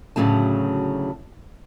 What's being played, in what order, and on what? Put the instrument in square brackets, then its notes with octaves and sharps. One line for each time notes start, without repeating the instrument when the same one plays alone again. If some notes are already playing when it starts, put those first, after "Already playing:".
[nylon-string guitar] D2 A2 C#3 F#3 A5